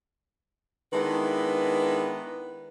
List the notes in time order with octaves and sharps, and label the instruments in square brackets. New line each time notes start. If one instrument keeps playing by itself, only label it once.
[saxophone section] D#3 G#3 B3 D4 E4 B4